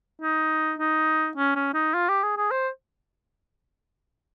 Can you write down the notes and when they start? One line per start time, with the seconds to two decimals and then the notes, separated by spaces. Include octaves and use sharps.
0.22 D#4
0.79 D#4
1.37 C#4
1.55 C#4
1.74 D#4
1.94 F4
2.09 G4
2.23 G#4
2.37 G#4
2.51 C5